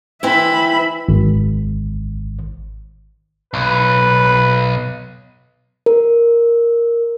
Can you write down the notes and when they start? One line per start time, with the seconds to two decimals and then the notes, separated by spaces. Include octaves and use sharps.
0.23 E3 C4 E4 E5 B5
1.09 G#1
3.54 B1 B4
5.86 A#4